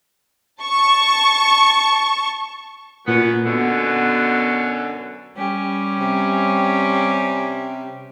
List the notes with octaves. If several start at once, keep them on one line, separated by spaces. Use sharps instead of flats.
A5 C#6
F#2 A#2 B3
F#2 B2 D3 B3
G3 C#4 G4
C3